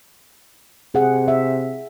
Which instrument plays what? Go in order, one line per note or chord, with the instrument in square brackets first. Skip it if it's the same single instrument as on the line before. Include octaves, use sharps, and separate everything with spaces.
[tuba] C3 [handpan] G#4 F#5
[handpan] E5